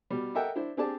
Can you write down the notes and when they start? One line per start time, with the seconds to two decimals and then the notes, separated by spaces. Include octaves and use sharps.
0.10 B2 G3
0.35 A4 A#4 D#5 E5 F#5 G5
0.55 D4 E4 C5
0.77 C4 D4 G4 G#4 D5 A5